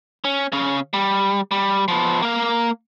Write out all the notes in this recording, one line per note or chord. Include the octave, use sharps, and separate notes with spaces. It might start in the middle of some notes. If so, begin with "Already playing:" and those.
C#4
C#3 C#4
G3
G3
F3 B3
A#3 F5